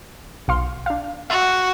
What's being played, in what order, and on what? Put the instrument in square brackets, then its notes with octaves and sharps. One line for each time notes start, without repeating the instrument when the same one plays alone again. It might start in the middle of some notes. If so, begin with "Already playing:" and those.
[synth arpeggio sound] B1 F5 C6
D4 F5
[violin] F#4 [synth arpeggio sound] E5